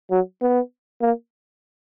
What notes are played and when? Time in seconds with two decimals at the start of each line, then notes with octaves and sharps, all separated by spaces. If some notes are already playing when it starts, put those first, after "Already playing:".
0.10 F#3
0.41 B3
1.02 A#3